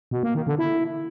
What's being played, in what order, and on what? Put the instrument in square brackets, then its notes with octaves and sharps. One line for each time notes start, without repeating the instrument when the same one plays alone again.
[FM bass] B2
A#3
D#3
D3
E4